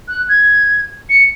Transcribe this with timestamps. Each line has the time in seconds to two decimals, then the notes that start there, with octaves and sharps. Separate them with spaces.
0.08 F#6
0.29 G#6
1.09 C#7